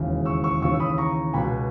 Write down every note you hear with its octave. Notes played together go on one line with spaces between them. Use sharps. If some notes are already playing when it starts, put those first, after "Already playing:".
Already playing: E1 D#2 C#3 E3
C#6 E6
C#6 E6
D#2 C#3 E3 C#6 E6
E6
B5 D#6
A#5 C#6
C#2 B2 G#5 B5